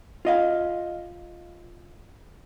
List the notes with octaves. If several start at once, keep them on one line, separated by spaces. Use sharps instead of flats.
F4 D#5 F5